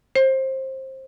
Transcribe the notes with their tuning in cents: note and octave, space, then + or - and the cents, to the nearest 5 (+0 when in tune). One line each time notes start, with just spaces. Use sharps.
C5 +20